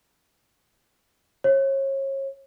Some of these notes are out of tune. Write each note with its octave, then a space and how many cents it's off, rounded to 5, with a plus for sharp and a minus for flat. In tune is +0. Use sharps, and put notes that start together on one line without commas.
C#5 -35